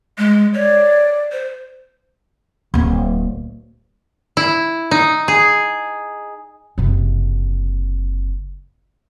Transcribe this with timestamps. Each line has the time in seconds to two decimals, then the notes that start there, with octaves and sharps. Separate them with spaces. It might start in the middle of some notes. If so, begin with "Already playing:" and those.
0.18 G#3
0.54 C#5 D5
1.32 C5
2.74 D1 A#3
4.37 E4
4.91 D#4
5.28 G#4
6.78 F#1 C3